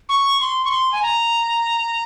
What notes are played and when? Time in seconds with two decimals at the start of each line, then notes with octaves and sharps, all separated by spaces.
0.09 C#6
0.40 C6
0.65 C#6
0.71 C6
0.92 G#5
1.03 A#5